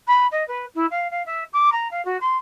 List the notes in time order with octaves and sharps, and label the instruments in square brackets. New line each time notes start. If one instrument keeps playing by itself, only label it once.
[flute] B5
D#5
B4
E4
F5
F5
E5
D6
A#5
F5
F#4
C6